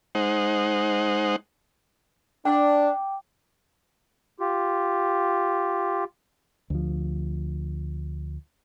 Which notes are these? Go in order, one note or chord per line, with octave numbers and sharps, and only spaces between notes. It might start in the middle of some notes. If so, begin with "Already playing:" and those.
G#3 D#4 C5 F#5
D4 G5 D6
F4 G4
D2 F3